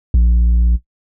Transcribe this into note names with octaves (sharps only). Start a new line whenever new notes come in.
A#1